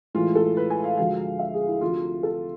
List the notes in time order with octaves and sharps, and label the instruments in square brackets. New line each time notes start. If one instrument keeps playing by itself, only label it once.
[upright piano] A2 E3 G#3 F4
A4
B4
G#5
F5
D2 D3 F3 G#3 F5
E5
G#4
E4
D2 C3 F3 F4
A4